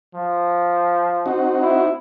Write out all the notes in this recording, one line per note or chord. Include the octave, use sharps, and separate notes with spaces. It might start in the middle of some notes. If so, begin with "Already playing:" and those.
F3
C4 D#4 F#4
E4